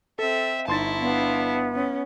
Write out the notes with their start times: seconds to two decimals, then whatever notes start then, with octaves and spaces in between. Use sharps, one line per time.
0.19 C4 A4 E5
0.68 G1 D#4 E4 A5 C6 A6
1.01 B3 D4 F5
1.75 C#4